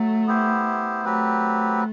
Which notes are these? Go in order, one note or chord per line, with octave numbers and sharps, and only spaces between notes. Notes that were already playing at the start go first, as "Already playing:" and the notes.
Already playing: F#3 A3
B3 E4 G4 C5
F#3 A3 C4 G4 B4